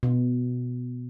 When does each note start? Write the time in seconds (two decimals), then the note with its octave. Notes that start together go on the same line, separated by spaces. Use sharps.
0.03 B2